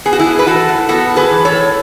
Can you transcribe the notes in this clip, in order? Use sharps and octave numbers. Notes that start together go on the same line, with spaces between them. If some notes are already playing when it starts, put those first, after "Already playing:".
B3 G#4
F#4
E4 G#4
A2
B4
E3 F#4 A4
A2
B3 F#4 A4
A2
G#4 B4
E3
A4 C#5
A2